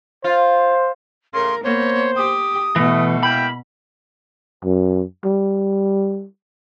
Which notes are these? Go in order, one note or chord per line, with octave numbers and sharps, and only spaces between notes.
F4 C5
A2 C#3 A#4 C6
A#3 B3 C5 C#5
G4 D#6
B2 E3 A3
G#3 A#3 E4 G5 B5
F#2
G3